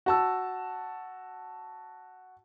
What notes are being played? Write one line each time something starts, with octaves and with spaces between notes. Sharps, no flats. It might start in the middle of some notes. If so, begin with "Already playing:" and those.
F#4 A5 E6